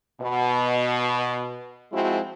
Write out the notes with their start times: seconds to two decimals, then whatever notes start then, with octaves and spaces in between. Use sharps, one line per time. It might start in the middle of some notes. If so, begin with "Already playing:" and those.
0.20 B2
1.92 F3 G#3 C4 E4 F#4